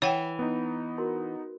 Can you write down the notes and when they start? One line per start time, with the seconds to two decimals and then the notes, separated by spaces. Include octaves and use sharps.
0.02 E3 C#5 F#5 G5
0.39 B3 D#4
0.98 F#4 A#4 C6